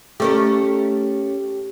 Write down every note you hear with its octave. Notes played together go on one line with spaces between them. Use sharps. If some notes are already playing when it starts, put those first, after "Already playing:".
A3 C#4 G4 A#4